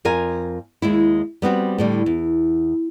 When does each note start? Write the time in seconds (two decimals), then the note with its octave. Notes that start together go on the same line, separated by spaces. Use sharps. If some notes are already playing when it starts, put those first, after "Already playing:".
0.05 F2 F4 A#4 G#5
0.82 D#2 G#3 E4
1.42 G3 B3 C4 F#4
1.78 A2 D3 G3
2.06 E2